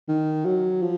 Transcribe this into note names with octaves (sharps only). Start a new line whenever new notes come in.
D#3
F#3
F3